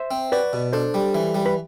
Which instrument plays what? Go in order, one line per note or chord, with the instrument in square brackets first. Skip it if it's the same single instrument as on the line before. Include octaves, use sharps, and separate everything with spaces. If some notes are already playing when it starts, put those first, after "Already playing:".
Already playing: [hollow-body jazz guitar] C5 E5
[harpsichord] C4
[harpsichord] F#4 [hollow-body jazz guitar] B4 D5
[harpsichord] B2
[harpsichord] D4 [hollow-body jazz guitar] A4 C5
[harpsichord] G3
E3
G3
[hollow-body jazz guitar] B4